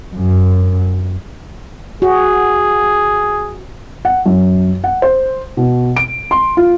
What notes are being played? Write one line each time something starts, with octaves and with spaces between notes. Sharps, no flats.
F#2
F#4 G#4
F#5
F#2
F#5
C5
B2
D7
C6
F4